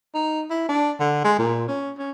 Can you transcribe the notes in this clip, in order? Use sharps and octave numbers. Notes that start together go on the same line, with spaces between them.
D#4
E4
D4
D3
G#3
A#2
C#4
C#4